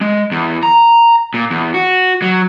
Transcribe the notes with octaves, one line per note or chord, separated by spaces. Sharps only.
G#3
E2
A#5
A#2
E2
F#4
F#3